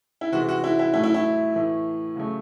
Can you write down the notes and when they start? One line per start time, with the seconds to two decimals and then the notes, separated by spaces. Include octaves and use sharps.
0.21 E4
0.32 C3 E3 G#3 F#4
0.49 F#4
0.64 E4
0.79 E4
0.93 A2 F#3 A3 E4
1.04 E4
1.14 E4
1.55 A2 E3 A3
2.16 C#3 F#3 A3